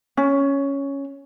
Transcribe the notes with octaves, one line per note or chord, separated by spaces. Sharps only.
C#4